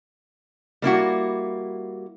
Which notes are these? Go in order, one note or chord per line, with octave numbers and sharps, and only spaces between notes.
G3 A#3 E4 F#4